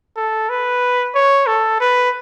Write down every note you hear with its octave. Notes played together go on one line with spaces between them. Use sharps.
A4
B4
C#5
A4
B4